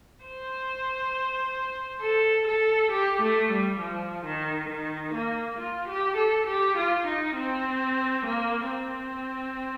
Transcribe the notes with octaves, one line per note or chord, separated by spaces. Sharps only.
C5
A4
A4
G4
A3
G3
F3
D#3
D#3
A#3
F4
G4
A4
G4
F4
D#4
C4
A#3
C4